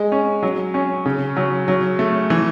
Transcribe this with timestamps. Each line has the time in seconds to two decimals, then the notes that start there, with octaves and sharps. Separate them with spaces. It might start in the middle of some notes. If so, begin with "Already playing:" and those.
Already playing: G#3
0.12 C#4
0.43 F#3
0.74 C#4
1.06 C#3
1.36 F#3
1.68 F#3
1.99 A3
2.30 E3